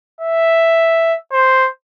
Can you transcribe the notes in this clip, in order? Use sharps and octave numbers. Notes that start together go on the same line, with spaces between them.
E5
C5